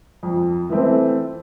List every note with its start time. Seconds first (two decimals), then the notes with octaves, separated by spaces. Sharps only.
0.23 F2
0.70 E3 A3 C4